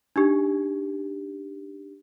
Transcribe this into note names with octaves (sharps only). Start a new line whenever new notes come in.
D4 D#4 G4